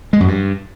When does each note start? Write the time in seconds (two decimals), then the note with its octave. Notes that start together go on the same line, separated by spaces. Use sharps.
0.13 G#3
0.20 F#2
0.28 G2